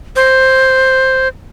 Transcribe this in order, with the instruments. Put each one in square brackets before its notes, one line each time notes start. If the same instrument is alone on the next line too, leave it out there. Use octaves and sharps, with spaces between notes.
[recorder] C5